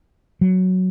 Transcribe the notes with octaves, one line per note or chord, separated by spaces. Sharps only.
F#3